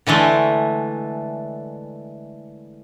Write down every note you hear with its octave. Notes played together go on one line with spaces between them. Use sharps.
D3 E3 G#3 A3